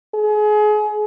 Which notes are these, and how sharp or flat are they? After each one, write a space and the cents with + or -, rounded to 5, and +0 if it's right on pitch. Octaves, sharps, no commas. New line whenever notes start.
G#4 +30